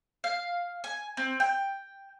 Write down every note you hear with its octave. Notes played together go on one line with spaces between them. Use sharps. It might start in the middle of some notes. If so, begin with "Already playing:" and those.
F5
G#5
C4
G5